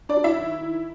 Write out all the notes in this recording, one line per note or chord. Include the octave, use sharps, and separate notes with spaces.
D4 D5
F#3
E4 E5
D#3
D#3